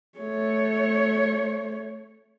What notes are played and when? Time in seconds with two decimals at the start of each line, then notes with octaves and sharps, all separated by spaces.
0.18 A3 C#5